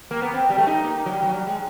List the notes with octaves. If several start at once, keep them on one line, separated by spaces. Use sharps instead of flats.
A#3
B3
C4
G3
A3
D#4
A#3
F#3
G3
F#3
G3
G#3